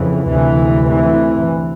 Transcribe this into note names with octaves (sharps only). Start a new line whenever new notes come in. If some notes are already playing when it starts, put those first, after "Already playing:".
Already playing: F2 C#3 E3
D2 C3 E3
E3